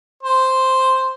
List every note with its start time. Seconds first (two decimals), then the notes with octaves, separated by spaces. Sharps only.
0.23 C5